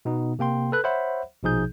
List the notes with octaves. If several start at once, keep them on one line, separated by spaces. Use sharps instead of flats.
B2 B3 D#4
C3 A#3 G5 C6
A4 B4 F#6
C5 C#5 E5 F#5 B5
A#1 B2 F3 D#4 G#4 G6